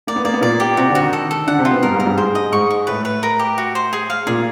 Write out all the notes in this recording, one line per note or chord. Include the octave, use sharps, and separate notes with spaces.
A#3 D5
B3
A#3 D5
B3
A#2 A#3 D5
G4
C3 C4 F#4
D3 D4
F#4
D#3 D#4
A4
A4
D3 D4 F#5
C3 C4
F4
B2 B3
G2 G3 A#4
G#2 G#3
A#4
G2 G3
G#2 G#3 C5
D#5
G#2 G#3 C#6
C#6
A2 A3 B4
B4
A#4
G4
F#4
C5
G#4
F5
A#2 A#3 G#4